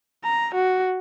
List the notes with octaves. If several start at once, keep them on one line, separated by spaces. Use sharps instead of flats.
A#5
F#4